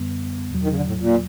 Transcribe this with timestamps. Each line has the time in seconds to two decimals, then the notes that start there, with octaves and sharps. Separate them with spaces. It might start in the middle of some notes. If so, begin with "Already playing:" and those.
Already playing: F#2 D3 G3 B3
0.51 E2 B2 F#3
0.63 D#3
0.71 C#3
0.76 D3
0.88 A2
1.00 A#2